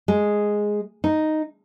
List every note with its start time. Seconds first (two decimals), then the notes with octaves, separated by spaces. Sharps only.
0.08 G#3
1.04 D#4